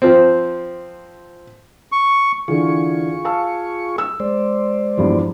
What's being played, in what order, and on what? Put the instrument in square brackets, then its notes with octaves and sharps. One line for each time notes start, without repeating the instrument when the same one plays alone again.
[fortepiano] F3 C4
[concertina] C#6
[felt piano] D3 E3 [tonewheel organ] F4 G#4 C#6
[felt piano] F5 A5 E6
E6
[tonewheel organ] G#3 C5 D5
[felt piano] E2 G2 F3